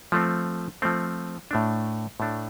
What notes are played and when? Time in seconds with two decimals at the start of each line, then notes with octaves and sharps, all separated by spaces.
0.12 F3 A3 C4
0.82 F3 A3 C4
1.51 A2 A3 D4
2.20 A2 A3 D4